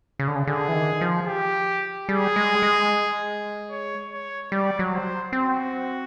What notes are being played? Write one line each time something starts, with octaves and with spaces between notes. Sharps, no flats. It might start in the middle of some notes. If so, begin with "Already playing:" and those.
C#3
D3
C#3
D3 G#4
E3
D#3
F3
G4
G3 G#4
G#3
G#3
C#5
C#5
G3 D5
F#3
C5
C4 F#4